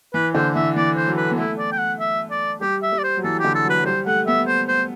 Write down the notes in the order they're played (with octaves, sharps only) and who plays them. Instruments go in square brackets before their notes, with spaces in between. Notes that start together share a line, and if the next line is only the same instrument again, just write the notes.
[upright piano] E3 [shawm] B4
[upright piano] D3 [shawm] C5
[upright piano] E3 [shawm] E5
[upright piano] E3 [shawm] D5
[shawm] C5
[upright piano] F#3
[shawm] B4
[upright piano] B3
[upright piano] A3 [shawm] E4
[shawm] D5
G5
F#5
E5
D5
[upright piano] G3 [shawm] G4
[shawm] E5
[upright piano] G3
[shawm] D5
C5
[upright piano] F#3
[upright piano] E3 [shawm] A4
[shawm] G4
[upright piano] D3
[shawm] A4
[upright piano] F#3 [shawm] B4
[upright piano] F#3
[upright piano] G3 [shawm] C5
[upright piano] A3 [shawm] F#5
[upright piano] B3 [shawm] E5
[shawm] C5
C5